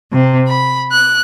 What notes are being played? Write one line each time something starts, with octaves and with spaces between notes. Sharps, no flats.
C3
B5
F#6